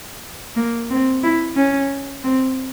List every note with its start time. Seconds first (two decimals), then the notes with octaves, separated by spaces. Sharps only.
0.56 A#3
0.90 C4
1.23 E4
1.56 C#4
2.23 C4